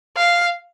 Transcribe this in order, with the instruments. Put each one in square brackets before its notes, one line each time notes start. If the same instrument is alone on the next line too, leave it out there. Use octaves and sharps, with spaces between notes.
[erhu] F5